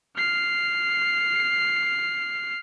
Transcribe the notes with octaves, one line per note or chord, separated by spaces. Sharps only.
F6 C7